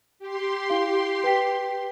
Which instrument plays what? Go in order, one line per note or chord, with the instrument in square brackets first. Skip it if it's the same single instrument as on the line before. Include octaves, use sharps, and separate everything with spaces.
[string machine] G4 C6
[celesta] E4 F5
B4 G5 B6